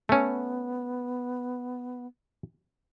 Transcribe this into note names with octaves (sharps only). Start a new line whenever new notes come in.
A3 B3 C#4